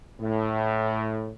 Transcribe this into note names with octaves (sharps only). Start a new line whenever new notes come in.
A2